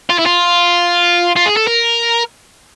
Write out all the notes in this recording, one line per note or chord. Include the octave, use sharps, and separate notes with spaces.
F4
E4
F4
F4
G#4
A4
A#4